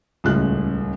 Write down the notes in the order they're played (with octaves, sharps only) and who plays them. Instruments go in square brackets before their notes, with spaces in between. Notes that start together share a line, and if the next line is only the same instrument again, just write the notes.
[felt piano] D#1 C#2 A2 G#3 F#6